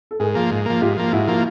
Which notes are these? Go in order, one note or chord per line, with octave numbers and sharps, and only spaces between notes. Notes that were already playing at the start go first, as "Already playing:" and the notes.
A4
G#2 G#4 A#4
F3 A#3
G#2
F3 A#3
G#2 F4 G4
F3 A#3
G#2 E4 F#4
F3 A#3